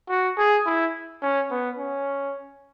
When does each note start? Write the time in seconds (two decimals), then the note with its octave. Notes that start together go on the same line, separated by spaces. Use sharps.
0.09 F#4
0.38 G#4
0.66 E4
1.22 C#4
1.51 B3
1.78 C#4